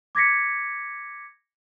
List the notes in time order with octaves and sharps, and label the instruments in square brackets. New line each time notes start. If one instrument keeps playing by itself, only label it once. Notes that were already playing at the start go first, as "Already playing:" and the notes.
[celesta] D6 G#6 A#6 B6 C#7